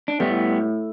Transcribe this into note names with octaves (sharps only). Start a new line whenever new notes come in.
D4
A2 G3 B3